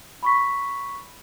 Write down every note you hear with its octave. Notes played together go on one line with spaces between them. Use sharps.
B5 C#6 B6